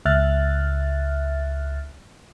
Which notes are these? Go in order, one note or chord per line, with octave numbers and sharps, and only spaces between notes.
C#2 E5 F6 F#6 A6